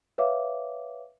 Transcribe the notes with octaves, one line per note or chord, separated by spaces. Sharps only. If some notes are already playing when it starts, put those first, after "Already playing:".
B4 C#5 E5 F5 D6